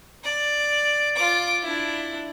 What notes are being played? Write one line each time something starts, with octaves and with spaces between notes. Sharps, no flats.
D5
F4 D6
D4 E4